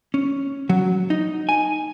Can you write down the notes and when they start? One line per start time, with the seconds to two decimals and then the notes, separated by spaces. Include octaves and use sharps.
0.14 C#4
0.69 F#3
1.10 D#4
1.49 G#5